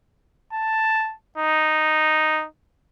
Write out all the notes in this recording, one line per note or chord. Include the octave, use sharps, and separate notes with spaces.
A5
D#4